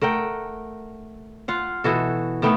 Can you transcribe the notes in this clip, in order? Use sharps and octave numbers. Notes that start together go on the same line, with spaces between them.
A3 A#4 F#5 G5
F4 F5 F#5
B2 E3 F#4 A4
D#3 A3 B3 G5